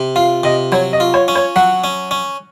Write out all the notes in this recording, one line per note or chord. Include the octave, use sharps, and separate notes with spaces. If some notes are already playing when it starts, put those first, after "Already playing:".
Already playing: C3
F4 F5
C3 D#5
F#3 C#5
D#5
F4
C#5
C#4
C#5
F#3 F#5
C#4
C#4